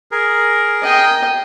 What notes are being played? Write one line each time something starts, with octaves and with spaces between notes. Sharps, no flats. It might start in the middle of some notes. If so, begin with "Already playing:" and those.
G#4 A#4
D#5 G5